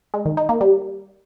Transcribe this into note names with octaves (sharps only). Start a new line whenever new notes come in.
G#3
D#3
D#4
A#3
G3